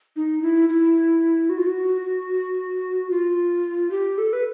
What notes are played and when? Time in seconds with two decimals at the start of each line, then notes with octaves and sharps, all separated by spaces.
0.16 D#4
0.42 E4
0.69 E4
1.50 F#4
1.58 F4
1.67 F#4
3.11 F4
3.91 G4
4.18 A4
4.33 B4